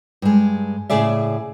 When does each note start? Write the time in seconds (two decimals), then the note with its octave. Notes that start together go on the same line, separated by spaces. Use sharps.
0.22 G2 G#3
0.90 A2 C#3 G#4 D5 E5